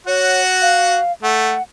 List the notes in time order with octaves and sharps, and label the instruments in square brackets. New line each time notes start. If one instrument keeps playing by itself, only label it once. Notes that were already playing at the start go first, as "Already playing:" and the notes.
[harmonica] F#4 F#5 [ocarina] C#5
[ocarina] F5
[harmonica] A3 [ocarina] F#5